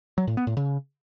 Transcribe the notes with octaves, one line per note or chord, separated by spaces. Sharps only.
F#3
A2
B3
A2
C#3